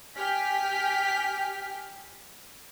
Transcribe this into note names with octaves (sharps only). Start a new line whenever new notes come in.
G4 G5 G#5 F6 B6